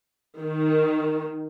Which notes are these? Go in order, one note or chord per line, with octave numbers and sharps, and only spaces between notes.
D#3